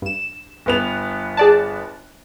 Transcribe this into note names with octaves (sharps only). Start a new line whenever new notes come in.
G2 E7
G1 B3 F7
G#4 D5 A5